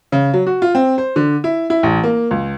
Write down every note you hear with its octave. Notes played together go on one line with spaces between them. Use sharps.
C#3
F#3
F#4
F4
C4
C5
D3
E4
E4
A1
A#3
C#2